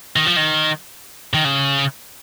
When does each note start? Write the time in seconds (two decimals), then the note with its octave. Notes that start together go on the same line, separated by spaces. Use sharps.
0.16 D#3
0.26 F3
0.37 D#3
1.34 D#3
1.45 C#3